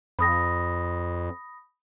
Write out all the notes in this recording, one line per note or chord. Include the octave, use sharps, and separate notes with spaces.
F2 B5 D#6 A#6